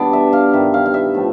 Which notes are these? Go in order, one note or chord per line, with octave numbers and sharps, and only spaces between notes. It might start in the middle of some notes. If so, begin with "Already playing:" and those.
Already playing: B2 G3 B3 D4 D5
E5
F5
G2 D#3 G3 E5
F5
F5
E5
A2 F3 A3